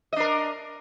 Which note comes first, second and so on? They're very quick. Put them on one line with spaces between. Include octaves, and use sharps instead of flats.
D#5 D4 A#4